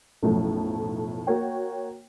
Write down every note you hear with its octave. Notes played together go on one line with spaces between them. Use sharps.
B1 F#2 A2 F3 A3
A#3 F#4 C#5 G5